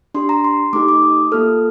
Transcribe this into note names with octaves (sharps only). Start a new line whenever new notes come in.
D4 G4 C6
A#5
C6
A3 D#4 G4 D6
D6
D#6
A#3 F4 A4 F6